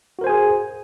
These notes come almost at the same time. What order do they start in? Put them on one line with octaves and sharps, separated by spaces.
F#4 A#4 C5 G#5 G#4